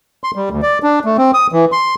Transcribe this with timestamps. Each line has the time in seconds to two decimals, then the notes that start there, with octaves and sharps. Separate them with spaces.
0.24 C6
0.36 G3
0.50 D2
0.62 D5
0.83 D4
1.05 A3
1.18 C4
1.34 D#6
1.52 E3
1.72 C6